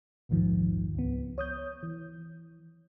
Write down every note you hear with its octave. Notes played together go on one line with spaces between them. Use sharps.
A#1 D#2 G#2 D#3 F3
C#2 B3
C#5 D#6 G6
E3